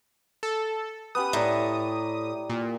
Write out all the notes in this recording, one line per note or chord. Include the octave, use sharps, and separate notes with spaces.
A4
B3 C#4 G4 D#6
A2 D5 A#5
A#2